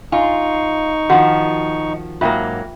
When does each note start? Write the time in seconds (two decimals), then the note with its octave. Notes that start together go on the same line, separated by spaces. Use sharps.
0.12 D#4 F4 G#5 C#6
1.10 D#3 F3 F#4 F#5
2.21 G#2 F#3 A#3 F4 E5 G5